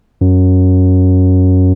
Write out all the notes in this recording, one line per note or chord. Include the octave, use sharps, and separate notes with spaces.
F#2